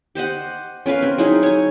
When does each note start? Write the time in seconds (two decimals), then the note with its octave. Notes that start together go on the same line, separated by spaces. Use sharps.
0.15 G4 C5 D#5 F#5
0.86 C#4 A#4 B4 F5
1.02 C4 A#4
1.18 F#3 D#4 E4 G#4
1.43 C#5 G#5